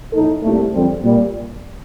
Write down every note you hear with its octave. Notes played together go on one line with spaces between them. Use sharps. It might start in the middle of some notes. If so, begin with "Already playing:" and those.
A#1 A2 A3 D#4 A4
C2 A#2 A3
F2 D3 G3 C4
A#2 G3